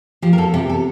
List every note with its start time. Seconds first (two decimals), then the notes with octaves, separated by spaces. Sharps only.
0.22 F3 G4
0.33 A#4
0.38 E2 A4
0.54 C3 G4
0.69 A4